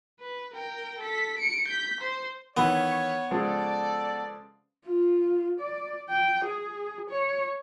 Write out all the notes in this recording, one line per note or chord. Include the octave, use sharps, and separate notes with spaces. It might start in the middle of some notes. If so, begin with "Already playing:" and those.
B4
A#4 G5
A4 B6
C#7 D7
G6 B6
C5
D#3 E3 B3 C#5 F5 B5
C#3 F3 G#3 A4 D5
F4
D5
G5
G#4
C#5